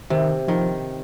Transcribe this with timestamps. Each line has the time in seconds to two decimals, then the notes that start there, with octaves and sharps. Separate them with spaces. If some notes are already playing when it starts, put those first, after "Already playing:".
0.10 C3 D#3
0.48 D#3 F3